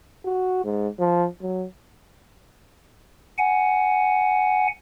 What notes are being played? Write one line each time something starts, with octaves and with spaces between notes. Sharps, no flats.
F#4
G#2
F3
F#3
F#5 G#5